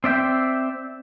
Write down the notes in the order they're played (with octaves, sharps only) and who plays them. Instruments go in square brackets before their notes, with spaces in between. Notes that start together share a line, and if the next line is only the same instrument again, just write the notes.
[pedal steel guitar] C4 D5 E5 G5